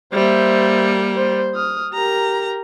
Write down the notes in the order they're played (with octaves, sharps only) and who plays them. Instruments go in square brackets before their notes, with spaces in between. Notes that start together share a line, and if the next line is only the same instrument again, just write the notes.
[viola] G3 A#3 [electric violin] C5 E5
[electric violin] C5
D#6 F6
[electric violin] G4 A#4 [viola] A#5